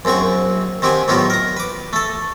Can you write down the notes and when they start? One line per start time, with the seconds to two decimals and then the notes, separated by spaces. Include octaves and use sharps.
0.05 A#1 F#2 C4 F#5 C#6
0.82 D#3 C4 G4 F#5 G#5
1.08 A2 F#3 B3 D#4 F4 G4
1.30 A#4 A#5
1.57 B4 D6
1.93 A3 A4